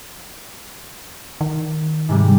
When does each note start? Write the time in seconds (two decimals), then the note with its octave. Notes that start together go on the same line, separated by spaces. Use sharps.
1.41 D#3
2.09 G#2 C3 G3